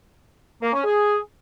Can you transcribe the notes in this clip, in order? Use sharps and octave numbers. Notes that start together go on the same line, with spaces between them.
A#3
C#4
G#4